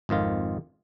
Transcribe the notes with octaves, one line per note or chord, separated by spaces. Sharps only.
G#1 F2 D#3 F4